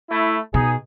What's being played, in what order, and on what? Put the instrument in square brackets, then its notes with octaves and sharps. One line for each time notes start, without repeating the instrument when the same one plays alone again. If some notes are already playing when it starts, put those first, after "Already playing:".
[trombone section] A3 E4
[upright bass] B2 [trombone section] D#4 G#4